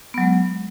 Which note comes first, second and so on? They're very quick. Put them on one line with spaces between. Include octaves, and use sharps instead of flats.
B3 F#3 G#3